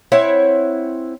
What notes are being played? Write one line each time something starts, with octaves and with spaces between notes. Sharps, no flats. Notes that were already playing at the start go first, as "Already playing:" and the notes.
C4 E4 C#5 F#5